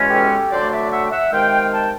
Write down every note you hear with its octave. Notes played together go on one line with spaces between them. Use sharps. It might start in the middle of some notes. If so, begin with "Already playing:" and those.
Already playing: E2 B2 G#3 C#4
G4 A4
D3 F#3 A3 C5 D5
D5 E5
E5 F#5
G5
E5 F#5
C3 D#3 G#3 F5 G5
G5 A5